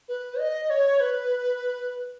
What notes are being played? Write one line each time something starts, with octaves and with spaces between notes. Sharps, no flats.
B4
D#5
C#5
B4